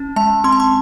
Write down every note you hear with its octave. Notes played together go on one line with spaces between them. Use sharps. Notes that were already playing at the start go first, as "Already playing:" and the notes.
Already playing: C#4
G#3 A5
C4 C6
A5
C6